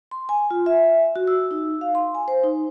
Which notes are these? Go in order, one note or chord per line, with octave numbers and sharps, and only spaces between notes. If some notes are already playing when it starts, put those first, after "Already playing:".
C6
G#5
F4
E5
F#4
E6
D#4
F5
C6
G#5
C5
D#4